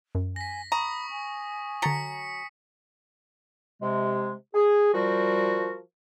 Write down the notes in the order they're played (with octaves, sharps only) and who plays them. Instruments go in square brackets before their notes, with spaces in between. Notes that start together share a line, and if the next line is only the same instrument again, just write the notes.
[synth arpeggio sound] F#2
[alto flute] G#5 [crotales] A#6 B6
[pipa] A#5 [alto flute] B5 [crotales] C#6 D#6 A#6
[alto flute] G#5
[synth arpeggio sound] D3 A5 A6 [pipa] F#3 A#5 [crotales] B6 C#7
[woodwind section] C3 G#3
G#4
F3 G3 F#4 A#4